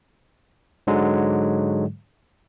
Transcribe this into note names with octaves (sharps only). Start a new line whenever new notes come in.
G#2 D3 F#3 G#3